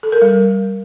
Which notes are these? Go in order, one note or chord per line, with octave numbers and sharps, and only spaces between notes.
A4
A#4
G3